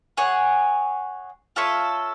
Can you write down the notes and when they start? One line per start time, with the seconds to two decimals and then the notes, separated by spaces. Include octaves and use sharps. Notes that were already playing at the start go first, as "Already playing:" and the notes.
0.17 G#4 C#5 F#5
1.56 F4 A4 C#5 E5